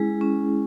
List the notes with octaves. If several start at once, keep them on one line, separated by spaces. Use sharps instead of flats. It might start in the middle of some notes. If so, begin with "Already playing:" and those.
Already playing: G#3 C#4 E4 G#4
C#4